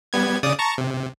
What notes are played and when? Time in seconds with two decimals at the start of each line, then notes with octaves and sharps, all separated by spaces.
0.13 G3 B3 G#6
0.43 C#3 D5 D#6
0.59 A5 A#5 C#6
0.78 C3